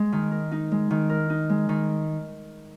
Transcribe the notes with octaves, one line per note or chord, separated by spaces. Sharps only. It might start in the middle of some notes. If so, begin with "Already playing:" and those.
Already playing: G#3
D#3
A#4
D#4
G#3
D#3
A#4
D#4
G#3
D#3